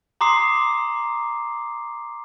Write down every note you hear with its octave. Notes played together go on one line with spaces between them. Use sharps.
A#5 C6 D6 D#6 C7